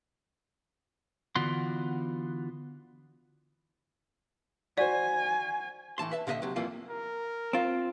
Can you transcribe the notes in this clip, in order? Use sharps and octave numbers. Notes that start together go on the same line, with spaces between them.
D3 E3 B3 F4 F#4 C6
F#4 C5 D5 G#5
A2 E3 A5 C6
B4 E5 A5
A#2 D3 G4 A#4 D#5 E5
C3 F#3
F2 A#2 E3 G3 A#3 F4
A#4
C4 F4